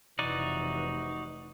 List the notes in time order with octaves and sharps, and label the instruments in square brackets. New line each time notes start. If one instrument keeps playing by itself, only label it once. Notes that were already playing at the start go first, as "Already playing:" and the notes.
[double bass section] F1 E3 [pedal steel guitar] D#4 F#4 D5